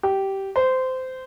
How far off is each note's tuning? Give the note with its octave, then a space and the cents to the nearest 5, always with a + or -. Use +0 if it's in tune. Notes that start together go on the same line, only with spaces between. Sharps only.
G4 -15
C5 -20